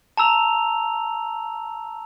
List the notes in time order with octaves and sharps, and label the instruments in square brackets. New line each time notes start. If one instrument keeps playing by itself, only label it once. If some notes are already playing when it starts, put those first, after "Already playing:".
[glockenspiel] A5 A#5 E6 F7